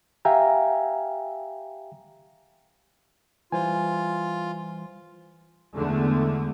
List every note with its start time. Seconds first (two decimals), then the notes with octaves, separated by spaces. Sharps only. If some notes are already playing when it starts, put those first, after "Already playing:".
0.25 G4 E5 F5 G5 G#5 A#5
3.52 E3 G3 F4 C5 G#5
5.77 E2 D3 G#3 A3